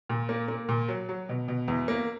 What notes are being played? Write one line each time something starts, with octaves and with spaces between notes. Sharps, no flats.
A#2
A#3
A#3
A#2
F#3
F#3
B2
B2
E2
A#3